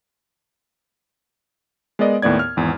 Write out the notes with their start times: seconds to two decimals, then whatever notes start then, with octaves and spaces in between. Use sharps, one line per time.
1.99 G#3 B3 A#4 D5 D#5
2.22 D#2 A2 B3 D5 G#6
2.39 F6
2.57 G#1 E2